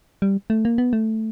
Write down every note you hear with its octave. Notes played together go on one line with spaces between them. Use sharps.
G3
A3
A#3
B3
A3